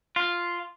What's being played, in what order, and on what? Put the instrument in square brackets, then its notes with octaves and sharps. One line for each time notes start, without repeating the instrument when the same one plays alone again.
[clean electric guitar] F4